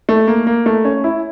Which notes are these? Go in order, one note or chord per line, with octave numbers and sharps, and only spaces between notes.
A3
A#3
A#3
A3
C#4
E4